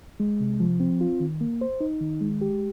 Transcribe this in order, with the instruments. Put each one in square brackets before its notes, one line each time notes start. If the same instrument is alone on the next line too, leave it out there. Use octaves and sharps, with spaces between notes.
[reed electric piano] G#3
C3
F3
C4
F4
D#3
A#3
C5
D#4
D#3
G#3
G4